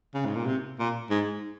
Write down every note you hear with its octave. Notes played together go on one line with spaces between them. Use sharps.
C#3
G#2
A#2
C3
A#2
G#2